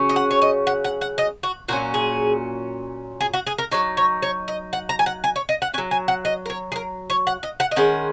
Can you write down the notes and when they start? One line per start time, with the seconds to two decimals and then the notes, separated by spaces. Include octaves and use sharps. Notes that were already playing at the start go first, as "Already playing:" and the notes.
Already playing: C#3 F#3 C#4
0.09 D#5
0.16 F#5
0.31 C#5
0.42 D#5
0.67 F#5
0.84 F#5
1.01 F#5
1.18 D#5
1.43 F#4
1.69 A#2 F#3 C#4 F#4
1.94 G#4
3.21 G#4
3.34 F#4
3.47 G#4
3.58 A#4
3.72 F#3 D#4 C#5
3.97 C#5
4.22 C#5
4.48 D#5
4.73 F#5
4.89 A#5
4.99 G#5
5.06 F#5
5.24 G#5
5.36 C#5
5.49 D#5
5.62 F#5
5.74 C#4 G#5
5.78 F#3
5.91 G#5
6.08 F#5
6.25 D#5
6.46 A#4
6.50 C#5
6.72 G#4
6.76 A#4
7.10 C#5
7.27 F#5
7.43 D#5
7.60 F#5
7.71 D#5
7.76 D#3 G#3 C#4 F#5